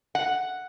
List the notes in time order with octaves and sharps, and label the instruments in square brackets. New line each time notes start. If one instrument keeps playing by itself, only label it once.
[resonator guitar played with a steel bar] F#5